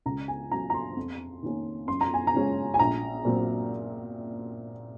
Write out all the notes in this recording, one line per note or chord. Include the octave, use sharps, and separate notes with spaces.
C#2 A#5
G#5
C#3 F#3 A#5
A#5
C6
F2
D#3 A#3 C#4
F#2 C6
A#5
G#5
A#5
C#3 G#3 C#4
G#5
A#1 A#5
A#2 F#3 C4